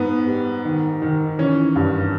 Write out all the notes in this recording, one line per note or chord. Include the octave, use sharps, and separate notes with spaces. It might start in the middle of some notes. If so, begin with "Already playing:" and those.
Already playing: G#2 B3
G3
D#3
D#3
E3 C#4
G2